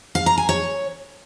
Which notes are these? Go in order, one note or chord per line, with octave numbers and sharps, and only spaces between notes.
F5
A#5
G#5
C#5